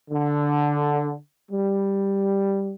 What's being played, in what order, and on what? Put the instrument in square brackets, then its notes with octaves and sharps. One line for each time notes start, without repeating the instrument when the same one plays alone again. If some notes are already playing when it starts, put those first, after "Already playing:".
[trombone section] D3
G3